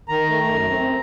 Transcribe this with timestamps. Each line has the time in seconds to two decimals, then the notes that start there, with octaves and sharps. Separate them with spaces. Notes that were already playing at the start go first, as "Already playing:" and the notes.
0.08 D#3 A#5
0.29 A3
0.49 F#2
0.70 C4